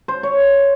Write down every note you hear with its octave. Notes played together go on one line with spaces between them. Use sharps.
C5
C#5